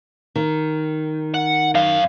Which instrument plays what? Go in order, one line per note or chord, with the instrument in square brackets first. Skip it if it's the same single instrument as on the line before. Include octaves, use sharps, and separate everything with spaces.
[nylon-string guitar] D#3
[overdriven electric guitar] F#5
F#2 F5